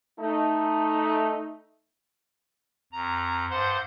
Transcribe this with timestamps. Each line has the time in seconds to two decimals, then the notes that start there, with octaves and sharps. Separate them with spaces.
0.20 A3 D#4
2.93 F2 A#5
3.50 G2 C5 F#5 C6 G6